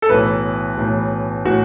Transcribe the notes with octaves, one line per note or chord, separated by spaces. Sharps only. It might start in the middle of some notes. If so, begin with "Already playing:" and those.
A4
B1 A2 E3 B4
B1 A2 E3
A2 E3 F#4